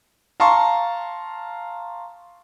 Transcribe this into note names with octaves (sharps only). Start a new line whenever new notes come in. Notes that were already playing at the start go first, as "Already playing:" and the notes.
F5 A5 A#5 C6 C#6